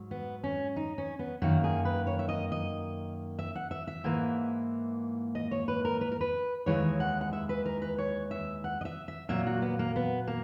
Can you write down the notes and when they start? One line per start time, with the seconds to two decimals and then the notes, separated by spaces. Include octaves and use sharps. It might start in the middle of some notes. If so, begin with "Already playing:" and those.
Already playing: G#2 F#3
0.11 B3
0.44 C#4
0.76 D#4
0.98 C#4
1.19 B3
1.42 F#2 D#3 A#3 F#4
1.64 G#4
1.85 B4
2.07 C#5
2.19 E5
2.29 D#5
2.52 D#5
3.39 E5
3.55 F#5
3.71 E5
3.87 E5
4.04 G#2 E3 A#3
5.35 D#5
5.51 C#5
5.68 B4
5.85 A#4
6.01 B4
6.12 A#4
6.21 B4
6.66 D#2 C#3 E3 G#3 C#5
7.00 F#5
7.21 F#5
7.33 E5
7.49 B4
7.65 A#4
7.82 B4
7.98 C#5
8.31 E5
8.64 F#5
8.81 D#5
8.85 E5
9.08 E5
9.29 A#2 F#3 A#3 E5
9.46 F#4
9.62 B3
9.79 A#3
9.96 B3
10.27 A#3